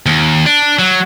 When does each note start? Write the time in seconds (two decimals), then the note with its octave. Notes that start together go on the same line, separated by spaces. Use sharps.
0.06 D#2
0.46 D4
0.79 F#3